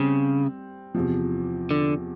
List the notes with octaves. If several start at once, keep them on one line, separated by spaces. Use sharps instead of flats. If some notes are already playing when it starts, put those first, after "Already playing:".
Already playing: C#3 G3 C4
E2 C3 F3
D3